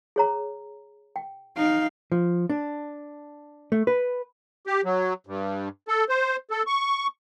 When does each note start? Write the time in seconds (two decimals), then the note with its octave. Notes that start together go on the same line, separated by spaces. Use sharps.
0.16 G#4 C#5 A#5
1.16 G5
1.57 D#4 F5
2.12 F3
2.50 D4
3.72 A3
3.87 B4
4.67 G4
4.85 F#3
5.27 G2
5.88 A4
6.09 C5
6.51 A4
6.67 C#6